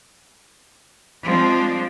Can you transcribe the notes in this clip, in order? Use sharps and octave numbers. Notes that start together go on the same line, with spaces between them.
F3 G#3 C4 D4